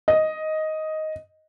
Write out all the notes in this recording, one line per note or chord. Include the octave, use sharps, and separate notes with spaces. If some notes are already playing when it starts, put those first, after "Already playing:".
D#5